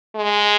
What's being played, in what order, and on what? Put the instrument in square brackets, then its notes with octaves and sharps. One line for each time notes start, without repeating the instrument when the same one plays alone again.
[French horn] G#3